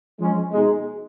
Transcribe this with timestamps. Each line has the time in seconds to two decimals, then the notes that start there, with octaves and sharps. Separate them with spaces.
0.19 F3 G#3 C#4
0.52 B2 G#3 D#4 G#4